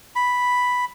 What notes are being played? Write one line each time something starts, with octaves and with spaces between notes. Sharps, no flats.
B5